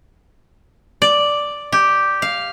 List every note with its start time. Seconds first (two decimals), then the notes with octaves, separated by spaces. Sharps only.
1.02 D5
1.72 G4
2.22 F5